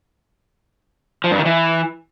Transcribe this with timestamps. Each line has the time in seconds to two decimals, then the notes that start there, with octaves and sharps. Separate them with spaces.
1.24 F3
1.31 G2
1.38 D#3
1.46 E3